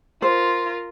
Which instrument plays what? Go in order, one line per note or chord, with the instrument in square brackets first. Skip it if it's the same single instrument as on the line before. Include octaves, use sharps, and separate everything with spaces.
[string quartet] F4 A#4 [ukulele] C5